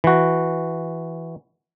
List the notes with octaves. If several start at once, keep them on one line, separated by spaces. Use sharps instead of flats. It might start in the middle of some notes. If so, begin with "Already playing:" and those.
E3 F#4